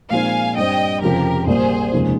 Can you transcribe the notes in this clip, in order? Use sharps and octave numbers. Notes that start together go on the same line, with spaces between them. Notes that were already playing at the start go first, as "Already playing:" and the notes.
A#2 F3 G#3 C4 D#4 F5 G#5
G2 G3 C4 D#5 G5
F1 F2 C#3 F3 G4 A#4
A#1 A#2 G3 A#3 G#4 C5
F1 D#2 C#3 F3 G#3